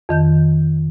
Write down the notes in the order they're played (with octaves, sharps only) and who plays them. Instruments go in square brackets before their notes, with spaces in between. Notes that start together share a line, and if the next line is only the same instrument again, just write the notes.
[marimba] F2 D#3 G6